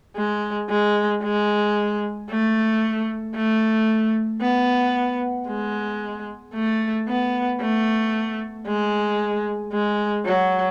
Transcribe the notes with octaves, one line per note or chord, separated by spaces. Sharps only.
G#3
G#3
G#3
A3
A3
B3
G#3
A3
B3
A3
G#3
G#3
F#3